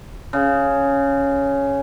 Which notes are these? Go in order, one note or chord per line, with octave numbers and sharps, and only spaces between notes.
C#3